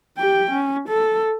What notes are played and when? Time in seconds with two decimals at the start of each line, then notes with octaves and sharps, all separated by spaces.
0.18 G4 G5
0.51 C#4
0.89 A4